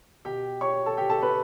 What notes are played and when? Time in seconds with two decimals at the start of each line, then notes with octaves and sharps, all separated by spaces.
0.25 B2 G4 G5
0.61 C#5 C#6
0.86 A4 A5
0.97 G4 G5
1.10 A4 A5
1.22 B4 B5